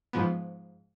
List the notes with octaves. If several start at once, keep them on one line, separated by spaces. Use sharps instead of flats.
G#2 F3 B3